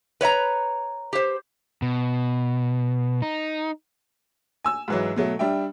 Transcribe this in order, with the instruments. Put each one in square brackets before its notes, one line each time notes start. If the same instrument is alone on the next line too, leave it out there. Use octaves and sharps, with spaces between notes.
[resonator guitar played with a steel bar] B4 C#5 E5 A#5
G4 C5
[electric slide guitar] B2
D#4
[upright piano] G#5 E6
G#2 E3 F#3
B2 F#3 A3
G3 D4 E5 G5